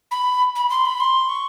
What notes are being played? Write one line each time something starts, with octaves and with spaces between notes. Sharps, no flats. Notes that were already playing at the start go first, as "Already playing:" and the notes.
B5
B5
C6
B5
C6
C#6